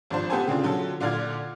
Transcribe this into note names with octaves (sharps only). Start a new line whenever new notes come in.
G#1 F3 D4 C5
A3 B3 G4 A4 C5 G#5
C#3 C4 D4 F4
D3 F#3 F4 A4
A#2 D3 F4 D5 F6 G#6